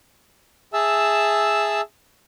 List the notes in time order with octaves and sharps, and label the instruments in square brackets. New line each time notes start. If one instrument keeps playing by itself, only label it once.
[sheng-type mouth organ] G#4 E5 A5 E6